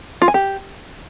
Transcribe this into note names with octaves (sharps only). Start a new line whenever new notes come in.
F4
G#5
G4